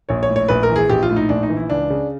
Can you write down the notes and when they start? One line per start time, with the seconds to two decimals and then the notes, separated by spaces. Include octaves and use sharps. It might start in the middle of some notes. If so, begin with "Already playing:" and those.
0.09 A#1 C#5
0.23 C#5
0.29 A2
0.36 C#5
0.48 A#1 B4
0.63 A#4
0.70 E3
0.76 G#4
0.89 A#1 G4
1.03 F4
1.09 A2
1.16 D#4
1.29 A#1 D4
1.43 D#4
1.50 E3
1.57 E4
1.70 C#2 D4
1.90 C#3